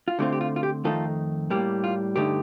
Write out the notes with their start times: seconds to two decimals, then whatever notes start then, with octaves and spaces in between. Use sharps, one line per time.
0.08 F4
0.19 D3 A3 C4 F4 G4
0.32 G4
0.41 F4
0.56 F4
0.63 G4
0.84 F2 D#3 A3 D#4 F4 A4
1.50 A2 G3 A#3 G4
1.84 F4
2.16 G2 D3 A3 D#4 G4